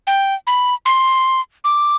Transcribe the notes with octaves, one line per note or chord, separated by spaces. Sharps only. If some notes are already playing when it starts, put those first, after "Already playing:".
G5
B5
C6
D6